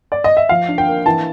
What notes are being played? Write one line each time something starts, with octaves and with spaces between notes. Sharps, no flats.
D5
D#5
E5
F3 F5
D4
G5
A#3
E3 A5